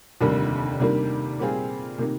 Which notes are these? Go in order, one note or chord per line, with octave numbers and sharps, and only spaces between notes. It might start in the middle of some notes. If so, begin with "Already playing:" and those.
F1 D#2 D3 G3 A#3
C3 D#3 G3 A#3 D4
A#2 G3 C4 F4 G#4
C3 D#3 A#3